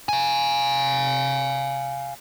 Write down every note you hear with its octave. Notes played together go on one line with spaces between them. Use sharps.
F5 G#5